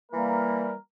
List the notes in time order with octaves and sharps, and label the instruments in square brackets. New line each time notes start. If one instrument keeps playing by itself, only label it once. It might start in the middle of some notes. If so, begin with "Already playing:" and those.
[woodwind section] E3 G3 A#3 [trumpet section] A#4